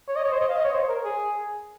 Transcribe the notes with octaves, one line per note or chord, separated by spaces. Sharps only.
C#5
D#5
C#5
C5
D#5
F5
D#5
C#5
C5
A#4
G#4